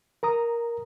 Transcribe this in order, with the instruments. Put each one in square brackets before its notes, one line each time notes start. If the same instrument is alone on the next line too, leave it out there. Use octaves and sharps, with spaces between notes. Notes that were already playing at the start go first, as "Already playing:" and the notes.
[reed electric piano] A#4 A#5 D#6